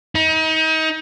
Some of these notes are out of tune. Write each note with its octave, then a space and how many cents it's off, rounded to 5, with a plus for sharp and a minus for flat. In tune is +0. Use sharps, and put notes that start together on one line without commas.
D#4 +35